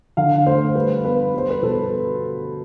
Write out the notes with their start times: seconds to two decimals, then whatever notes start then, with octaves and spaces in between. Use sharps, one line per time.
0.17 D3 F5
0.47 A3 C5
0.75 G3 B4
1.05 B3 B4
1.34 G3 C5
1.50 B4
1.62 B2 A4